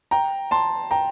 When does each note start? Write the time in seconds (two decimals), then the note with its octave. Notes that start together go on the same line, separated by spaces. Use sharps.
0.11 G5 A#5
0.51 A5 C6
0.91 G5 A#5